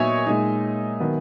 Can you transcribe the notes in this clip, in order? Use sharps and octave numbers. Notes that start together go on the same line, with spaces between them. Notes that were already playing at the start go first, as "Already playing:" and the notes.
Already playing: A#2 F#3 B3 D#4 C#5 E5 G#5
A#2 G#3 D#4
D#3 F#3 B3